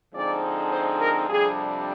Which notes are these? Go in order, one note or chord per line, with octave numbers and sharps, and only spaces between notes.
D3 F3 G#3 C4 D#4 D5
C5
A#4
F2 C3 G3 D4 G#4